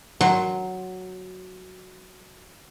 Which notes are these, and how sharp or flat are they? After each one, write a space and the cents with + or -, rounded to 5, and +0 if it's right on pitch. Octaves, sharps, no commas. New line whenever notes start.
F#3 +0 C6 +15